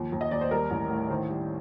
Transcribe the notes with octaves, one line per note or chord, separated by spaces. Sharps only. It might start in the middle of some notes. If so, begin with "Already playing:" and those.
Already playing: D#2 F3
D#2
D#5
D#2 D5
C5
G3 A#4
A1
A2
D#3 C5
G3